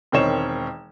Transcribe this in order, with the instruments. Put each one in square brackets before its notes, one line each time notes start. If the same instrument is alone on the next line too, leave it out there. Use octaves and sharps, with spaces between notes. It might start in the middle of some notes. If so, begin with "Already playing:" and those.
[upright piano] E1 D#3 C4 D#4 C#5 E7